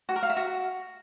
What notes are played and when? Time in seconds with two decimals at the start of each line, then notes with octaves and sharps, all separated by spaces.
0.09 F#4
0.16 A#4
0.23 F5
0.30 E5
0.37 F#4